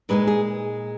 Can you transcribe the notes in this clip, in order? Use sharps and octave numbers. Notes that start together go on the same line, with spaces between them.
A#2 G#3 D#4 B4
G#4